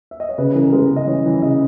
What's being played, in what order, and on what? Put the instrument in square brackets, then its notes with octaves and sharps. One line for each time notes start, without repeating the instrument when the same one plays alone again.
[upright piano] E5
D#5
C#5
C#3 B4
E3 A#4
A#4
G#3 B4
C#3
D#5
E3 C#5
E3
C#3 D#5